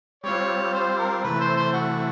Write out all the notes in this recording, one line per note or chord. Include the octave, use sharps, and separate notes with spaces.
G3 C4 F4 C#5
C5
A#4
C3 E3 A3 B4
C5
C5
F#4